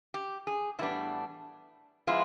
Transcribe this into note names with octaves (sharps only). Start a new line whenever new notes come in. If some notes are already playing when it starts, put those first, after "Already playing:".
G4
G#4
A2 E3 G3 B3 D4 E4
F3 G#3 B3 E4 F4